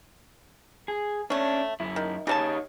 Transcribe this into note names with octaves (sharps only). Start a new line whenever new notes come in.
G#4
A3 C#4 D4 C#5
F#2 E4
D#3
C#3 D4 D#4 G4 C#5 A5